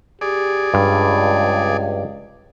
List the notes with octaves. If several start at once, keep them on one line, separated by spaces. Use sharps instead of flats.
G4 G#4 D5
C#2 G2